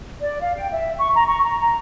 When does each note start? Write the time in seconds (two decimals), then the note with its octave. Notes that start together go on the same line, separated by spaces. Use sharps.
0.22 D5
0.42 F5
0.57 G5
0.71 E5
0.99 C#6
1.15 A#5
1.26 C#6
1.44 A#5
1.59 A#5